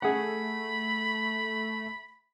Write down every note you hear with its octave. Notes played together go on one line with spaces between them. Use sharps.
A3 G#4 F#5 B5